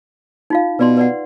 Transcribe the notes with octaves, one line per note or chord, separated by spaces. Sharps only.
D#4 F4 F5
B2 B4 D5 C6
B4 D5 F#5